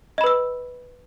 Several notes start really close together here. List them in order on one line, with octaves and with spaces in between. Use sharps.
D#5 B5 B4 E6